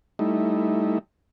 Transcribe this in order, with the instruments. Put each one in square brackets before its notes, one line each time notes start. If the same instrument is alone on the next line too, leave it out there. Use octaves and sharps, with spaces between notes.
[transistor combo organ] G3 A3 D#4 E4